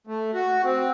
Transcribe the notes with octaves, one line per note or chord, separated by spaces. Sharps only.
A3
F#4
C4